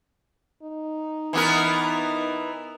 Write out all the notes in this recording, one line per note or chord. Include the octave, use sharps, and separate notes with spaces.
D#4
E3 B3 A#4